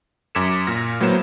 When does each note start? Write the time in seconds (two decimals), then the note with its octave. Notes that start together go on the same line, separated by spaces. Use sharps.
0.35 F#2 D6 G#6 B6 C#7 E7
0.67 A#2 F6 A#6
1.00 A2 F#3 A#3 B3 C5 E7